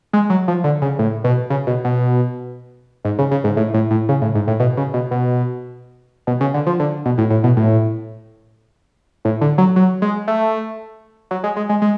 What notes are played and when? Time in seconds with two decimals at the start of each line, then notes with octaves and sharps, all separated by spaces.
0.13 G#3
0.30 F#3
0.48 F3
0.64 D3
0.82 C#3
0.99 A2
1.24 B2
1.50 C#3
1.67 B2
1.85 B2
3.05 G#2
3.19 C#3
3.31 C#3
3.44 G#2
3.57 A2
3.74 A2
3.91 A2
4.09 C#3
4.22 A2
4.35 G#2
4.47 A2
4.60 B2
4.77 C#3
4.94 B2
5.11 B2
6.27 B2
6.41 C#3
6.54 D3
6.66 F3
6.80 D3
7.05 B2
7.18 A2
7.30 A2
7.44 B2
7.57 A2
9.25 A2
9.41 D3
9.58 F#3
9.76 F#3
10.02 G#3
10.27 A3
11.31 F#3
11.44 G#3
11.56 G#3
11.69 G#3
11.82 G#3